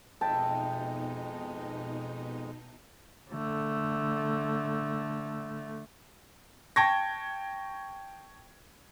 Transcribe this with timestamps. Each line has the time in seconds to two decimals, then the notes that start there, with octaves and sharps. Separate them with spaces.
0.21 F2 B2 G#3 D#4 E5 G5 A5
3.31 D3 A3
6.76 G5 A5 C#6 G#6 A#6